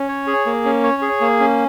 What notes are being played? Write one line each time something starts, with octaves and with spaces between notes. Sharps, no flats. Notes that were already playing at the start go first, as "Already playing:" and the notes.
Already playing: C#4
C#5
G#4
A#3
C#4
C#5
G#4
A#3
C#4